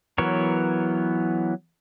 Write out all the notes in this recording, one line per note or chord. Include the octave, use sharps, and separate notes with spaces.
E3 F#3 B3 A#4 C#5